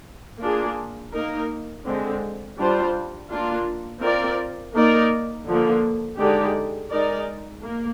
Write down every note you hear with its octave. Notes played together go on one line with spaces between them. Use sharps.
A#3 D4 F4 G#4
A#3 D#4 A#4
D3 G#3 C4
G3 D4 F4 C5
A#3 D4 F4
C4 F4 A#4 D5
A#3 D#4 A#4 D5
D3 F3 A#3
D3 G#3 D#4 G4 D5
G#3 D#4 A#4 D5
A#3